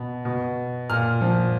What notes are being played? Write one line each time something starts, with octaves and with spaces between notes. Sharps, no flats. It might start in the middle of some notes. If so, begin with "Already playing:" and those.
Already playing: B2
B2
A#2 F6
F3